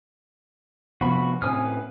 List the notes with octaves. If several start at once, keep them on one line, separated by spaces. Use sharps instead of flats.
C3 F3 B3 F#4 B5
A2 C4 C#4 G#5 D#6 F6
B4